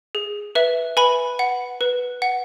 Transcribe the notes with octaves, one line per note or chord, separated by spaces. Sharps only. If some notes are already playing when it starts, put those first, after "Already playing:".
G#4
B4 E5
B4 G#5 B5
F#5
B4
F#5